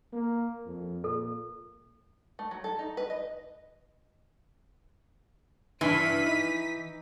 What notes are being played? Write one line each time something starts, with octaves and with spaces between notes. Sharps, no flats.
A#3
F2
A#2 A4
A3
F#3
A4
D#4
B4
D#5
G2 E3 E4 B6 D#7
D#4